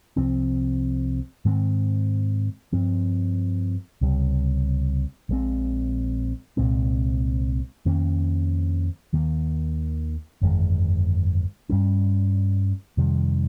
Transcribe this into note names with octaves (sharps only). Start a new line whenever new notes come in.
C2 C3 F3 C4
G#2 D#3 G#3 C4
G2 F3 C4
C#2 C3 G3
A#1 A#2 G#3 C4
C2 A#2 G#3 C4
F2 D#3 A#3 C#4
D#2 D#3 A#3
G1 F2 D#3 G#3
G2 G3 C#4
F2 C3 D#3 G3